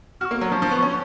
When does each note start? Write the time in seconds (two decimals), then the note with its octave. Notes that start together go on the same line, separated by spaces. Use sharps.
0.21 F#4 F6
0.25 C#6
0.31 A#3
0.41 F#3
0.52 F3
0.62 F3
0.71 B3
0.83 C#4